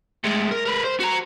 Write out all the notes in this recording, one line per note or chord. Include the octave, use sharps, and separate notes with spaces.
A2 G#3
A#4
A#4 B4
C5
F#4 A#5